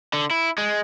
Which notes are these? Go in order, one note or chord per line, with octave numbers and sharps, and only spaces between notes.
D3
E4
G#3